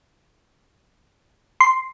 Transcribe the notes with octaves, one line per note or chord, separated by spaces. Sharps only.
C6